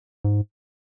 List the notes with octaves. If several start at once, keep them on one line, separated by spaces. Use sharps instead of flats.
G#2